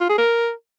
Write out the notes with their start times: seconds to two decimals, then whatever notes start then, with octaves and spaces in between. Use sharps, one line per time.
0.01 F4
0.09 G#4
0.18 A#4